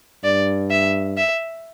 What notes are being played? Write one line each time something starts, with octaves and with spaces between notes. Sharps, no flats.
G2 D5
E5
E5